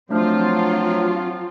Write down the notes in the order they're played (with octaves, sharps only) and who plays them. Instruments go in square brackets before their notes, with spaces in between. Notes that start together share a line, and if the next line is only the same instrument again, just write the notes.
[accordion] F3 [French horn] F#3 [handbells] A3 D4 F6 [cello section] C4 F4